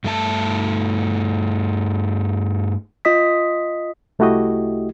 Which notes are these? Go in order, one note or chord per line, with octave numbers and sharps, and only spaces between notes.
G2 A3 D4 A5
F4 D#5 D#6 B6
C2 A3 E4 F#4 G4 D#5